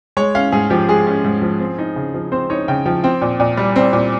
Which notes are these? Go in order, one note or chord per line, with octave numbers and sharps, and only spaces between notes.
G#3 C#5
C#4 F5
G#2 G#4
F3 G4
G#3 G#4
C#4
G#2
F3
C4
D#4
C#3
F3
C4 C5
D#4 C#5
C#3 G5
F3 G5
C4 G5
A#2
A#2
G3
C4
A#2